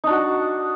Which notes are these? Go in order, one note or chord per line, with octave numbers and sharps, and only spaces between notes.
D4 D#4 F#4